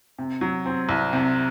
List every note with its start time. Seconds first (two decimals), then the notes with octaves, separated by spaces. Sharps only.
0.18 C3
0.41 F#3
0.66 C4
0.89 C2
1.13 C3